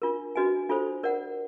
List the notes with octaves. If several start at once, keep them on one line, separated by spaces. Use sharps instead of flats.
D4 F4 A#4
D4 F#4 B4 D#5 G#5
D4 F4 A4 C5
A#4 D5 F#5